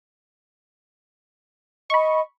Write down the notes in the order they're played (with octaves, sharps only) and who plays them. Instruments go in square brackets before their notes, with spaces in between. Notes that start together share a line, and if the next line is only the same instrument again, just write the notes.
[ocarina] D#5 [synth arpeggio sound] B5 C#6